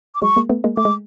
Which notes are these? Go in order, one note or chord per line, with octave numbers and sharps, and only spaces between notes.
D6
F#3 G#3 C#6
G#3 A#3
A3 B3
G#3 A#3
A3 D6
G#3